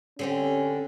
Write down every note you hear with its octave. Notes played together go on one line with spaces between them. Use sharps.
D3 C4 C#4 G4